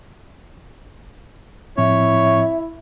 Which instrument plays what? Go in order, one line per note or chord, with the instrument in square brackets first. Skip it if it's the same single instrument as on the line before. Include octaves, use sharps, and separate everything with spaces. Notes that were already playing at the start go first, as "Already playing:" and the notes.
[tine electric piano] A2 F3 C4 [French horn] E4 [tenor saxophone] C#5 [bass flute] E5